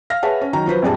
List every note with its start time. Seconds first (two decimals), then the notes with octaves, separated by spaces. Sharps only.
0.10 F5 F6 A#6
0.23 G#4 B4 C#5 E5 F#5 A5
0.41 C#4
0.53 D#3 F#3 A#5
0.66 F3 F#3 B4 C5
0.82 A#1 F2 G3 G#4 A5